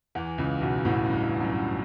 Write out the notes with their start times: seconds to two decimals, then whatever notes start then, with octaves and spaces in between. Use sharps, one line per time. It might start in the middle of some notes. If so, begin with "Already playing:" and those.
0.15 E2 E3
0.38 C#2 C#3
0.61 B1 B2
0.85 A1 A2
1.10 G2
1.41 F#2